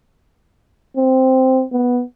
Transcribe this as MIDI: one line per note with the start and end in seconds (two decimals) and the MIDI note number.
0.97 1.64 60
1.72 2.02 59